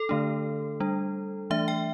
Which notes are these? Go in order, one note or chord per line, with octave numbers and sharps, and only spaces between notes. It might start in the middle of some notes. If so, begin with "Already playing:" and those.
Already playing: A4
D3 A3 D4
G3 D4
E3 A3 D4 E5
G5